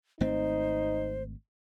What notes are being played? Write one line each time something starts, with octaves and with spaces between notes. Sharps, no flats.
G#1 A3 C4 D#4 C5